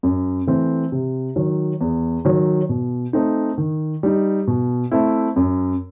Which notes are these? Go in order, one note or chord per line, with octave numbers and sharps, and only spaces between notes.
F#2
E3 A3 C4
C3
D#3 F#3
E2
D#3 F#3
B2
A3 C4 D#4
D#3
G3 D#4
B2
A3 C4 E4
F#2